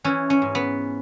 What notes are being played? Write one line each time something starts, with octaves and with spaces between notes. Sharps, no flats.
E3 C#4
C#4
G#2
B3